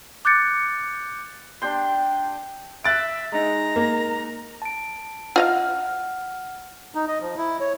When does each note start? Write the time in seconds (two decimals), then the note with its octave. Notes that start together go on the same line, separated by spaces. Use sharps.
0.25 D6 F#6 G6 A6 C#7
1.62 D4 G4 G5 C6
2.84 E5 F#6 A6 D7
3.32 G#3 D#4 A#5
3.76 A#3
4.62 A5 D7
5.36 F4 D#5 F5 F#5 F6
6.95 D#4
7.08 D#5
7.20 F3
7.38 E4
7.60 C#5